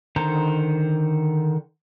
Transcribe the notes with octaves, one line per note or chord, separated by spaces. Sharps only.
D3 D#3 C5 A#5